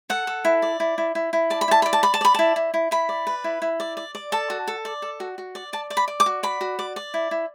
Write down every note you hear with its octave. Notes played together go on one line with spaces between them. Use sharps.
A4 F#5
A4
E4
D5
E4
E4
E4
E4
D5 A5
B5
E4 A5
D5 B5
A5
D5 B5
A5
D5 B5
E4 A5
E4
E4
E4 B5
D5
B4
E4
E4
D5
D5
D5
A4 A5
F#4
A4
D5
A4
F#4
F#4
D5
D5 A5
D5
B5
D5
D6
F#4
D5 B5
F#4
D5
D5
E4
E4